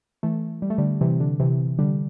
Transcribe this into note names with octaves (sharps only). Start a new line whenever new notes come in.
E3 A3
G3
A3
D3 G3
C3 E3
D3
C3 E3
D3 G3